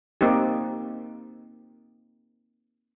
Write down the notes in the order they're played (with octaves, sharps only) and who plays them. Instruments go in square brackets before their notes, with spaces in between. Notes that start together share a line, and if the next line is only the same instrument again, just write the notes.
[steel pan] A#3 C4 D#4 G4